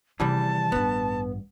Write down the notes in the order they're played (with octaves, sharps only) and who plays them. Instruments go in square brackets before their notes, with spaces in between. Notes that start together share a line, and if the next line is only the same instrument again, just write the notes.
[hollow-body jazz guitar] E2 E3 G3 [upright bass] C3 D#3 [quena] A5
[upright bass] A1 G2 [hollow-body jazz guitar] B3